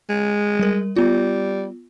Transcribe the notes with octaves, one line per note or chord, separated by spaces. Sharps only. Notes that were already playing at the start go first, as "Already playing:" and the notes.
G#3
G3 A#4
G3 B3 F4